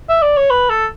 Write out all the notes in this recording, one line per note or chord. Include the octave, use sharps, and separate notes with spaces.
E5
D5
C#5
B4
A4